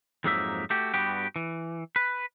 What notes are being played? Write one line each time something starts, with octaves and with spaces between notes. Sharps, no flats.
F2 G#2 F#3 A#3 D#4 E5
A3 F#4 G4
G2 G3 B3 F#4 G4
E3
B4